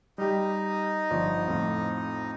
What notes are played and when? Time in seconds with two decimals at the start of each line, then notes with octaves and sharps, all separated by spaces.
0.18 G3 D#4 G4 D#5
1.10 G1 F3 D5
1.48 F2 A2 F3